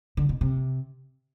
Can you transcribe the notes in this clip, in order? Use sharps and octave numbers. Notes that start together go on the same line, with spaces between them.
D3
B2
C3